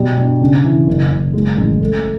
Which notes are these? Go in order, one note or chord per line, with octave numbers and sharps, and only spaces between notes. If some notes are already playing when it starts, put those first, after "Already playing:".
Already playing: B2 G3
G2
C#3
E3
F#1
F#1
G#3
A1
A3